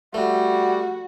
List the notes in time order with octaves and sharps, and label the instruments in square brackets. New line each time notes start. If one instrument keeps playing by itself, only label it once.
[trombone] G3 [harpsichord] A3 [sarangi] F#4